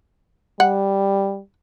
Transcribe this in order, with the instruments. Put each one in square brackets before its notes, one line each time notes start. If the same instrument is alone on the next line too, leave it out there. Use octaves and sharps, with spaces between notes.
[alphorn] G3 [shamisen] F#5